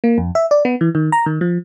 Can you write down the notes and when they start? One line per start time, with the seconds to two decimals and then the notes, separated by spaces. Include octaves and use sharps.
0.04 A#3
0.18 F2
0.35 E5
0.51 D5
0.65 B3
0.81 E3
0.95 D#3
1.12 A#5
1.26 D#3
1.41 F3